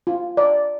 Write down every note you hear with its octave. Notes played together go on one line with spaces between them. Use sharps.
F4
D5